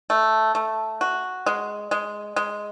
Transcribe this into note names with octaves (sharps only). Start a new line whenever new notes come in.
A3
A3
F#4
G#3
G#3
G#3